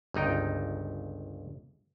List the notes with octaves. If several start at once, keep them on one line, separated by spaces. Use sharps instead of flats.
G1 C#2 D#4 G5